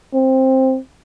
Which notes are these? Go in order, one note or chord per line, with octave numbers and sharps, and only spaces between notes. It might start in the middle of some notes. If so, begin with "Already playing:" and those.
C4